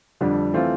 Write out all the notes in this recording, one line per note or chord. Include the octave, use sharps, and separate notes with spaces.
F2 D3 G3 D4
E3 A3 C4 F4